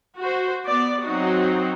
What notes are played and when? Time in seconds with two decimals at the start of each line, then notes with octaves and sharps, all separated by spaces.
0.18 F#4 C5
0.67 B3 D5
1.04 F#3 C4 D#4 F#4